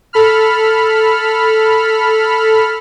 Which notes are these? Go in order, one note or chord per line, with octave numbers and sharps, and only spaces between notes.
A4 B5 F6